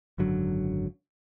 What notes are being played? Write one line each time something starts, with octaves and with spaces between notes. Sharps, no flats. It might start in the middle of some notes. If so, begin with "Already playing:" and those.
G#1 F#2 D3 F#3